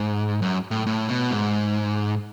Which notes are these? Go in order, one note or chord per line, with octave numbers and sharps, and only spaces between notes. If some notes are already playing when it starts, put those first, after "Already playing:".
Already playing: G#2
F#2
A2
A2
B2
G#2